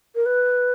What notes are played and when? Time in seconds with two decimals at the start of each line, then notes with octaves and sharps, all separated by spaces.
0.16 A#4
0.26 B4